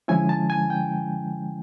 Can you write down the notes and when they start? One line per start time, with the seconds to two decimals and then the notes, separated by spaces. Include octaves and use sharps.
0.08 D3 F3 G#3 C#4 E4 G#5
0.29 A5
0.50 G#5
0.70 G5